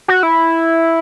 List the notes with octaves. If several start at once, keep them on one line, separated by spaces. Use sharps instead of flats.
F#4
E4